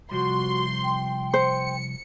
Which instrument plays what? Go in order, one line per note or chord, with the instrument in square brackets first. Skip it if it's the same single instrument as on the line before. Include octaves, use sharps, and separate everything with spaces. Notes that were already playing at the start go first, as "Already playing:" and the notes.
[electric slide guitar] C3 F3 G3 [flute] F#4 [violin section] C6
[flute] G5
[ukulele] C5 [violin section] C#7